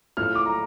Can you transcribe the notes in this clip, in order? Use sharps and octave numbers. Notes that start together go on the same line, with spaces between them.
A2 F3 A3 F6
D6
A#5